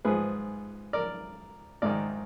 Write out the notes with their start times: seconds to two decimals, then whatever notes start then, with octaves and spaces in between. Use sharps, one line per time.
0.05 G#2 F3 G#4 B4
0.93 A#4 D5
1.82 G#2 D#3 A#4 D5